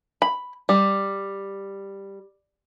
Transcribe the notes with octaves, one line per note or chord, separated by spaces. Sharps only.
B5
G3